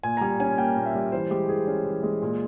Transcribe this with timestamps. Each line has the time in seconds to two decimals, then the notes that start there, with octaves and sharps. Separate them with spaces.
0.03 A#2 G#5
0.17 A#5
0.21 G3 G#5
0.40 C#4 G#5
0.58 A#3 G5
0.76 A#2
0.86 E5
0.95 G3
1.12 E3 C5
1.31 G#3 G4
1.49 E3 G#4
1.67 C#4
1.86 E3
2.03 G#3
2.22 A#2